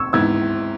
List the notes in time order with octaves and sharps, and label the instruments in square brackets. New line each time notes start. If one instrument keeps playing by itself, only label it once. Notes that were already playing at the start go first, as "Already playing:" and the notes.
Already playing: [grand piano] C#6 E6 G#6
[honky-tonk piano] G#2 E3 B3 E4 [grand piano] E6 G#6